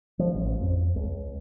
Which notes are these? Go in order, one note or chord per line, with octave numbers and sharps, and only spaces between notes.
F3
A1
F2
C#2